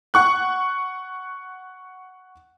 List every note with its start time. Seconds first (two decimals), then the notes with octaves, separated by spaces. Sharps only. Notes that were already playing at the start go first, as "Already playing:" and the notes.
0.14 F#5 C#6 F#6